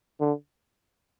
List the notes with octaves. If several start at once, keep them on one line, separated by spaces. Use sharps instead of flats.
D3